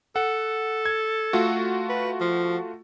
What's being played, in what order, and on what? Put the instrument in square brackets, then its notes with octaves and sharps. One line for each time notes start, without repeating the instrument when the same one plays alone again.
[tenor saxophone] A4 [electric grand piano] F#5
[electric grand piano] G#6
A3 F4 F#4
[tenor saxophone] B4
F3